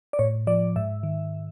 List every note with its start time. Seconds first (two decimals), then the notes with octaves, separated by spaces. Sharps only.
0.13 D5
0.19 A2 C#5
0.47 F3 D5
0.76 G#2 E5
1.03 D#3